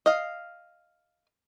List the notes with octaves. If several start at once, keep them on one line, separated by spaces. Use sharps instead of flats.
D#5 F5